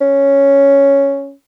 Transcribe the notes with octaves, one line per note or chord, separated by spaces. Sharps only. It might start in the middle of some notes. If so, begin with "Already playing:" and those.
C#4